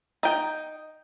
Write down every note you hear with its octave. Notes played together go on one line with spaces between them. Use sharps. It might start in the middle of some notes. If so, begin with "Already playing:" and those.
D#4 G5